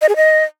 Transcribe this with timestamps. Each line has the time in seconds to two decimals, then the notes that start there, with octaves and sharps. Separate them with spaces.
0.02 D#5
0.09 G#4
0.16 D#5